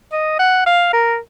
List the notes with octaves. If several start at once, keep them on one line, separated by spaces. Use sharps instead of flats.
D#5
F#5
F5
A#4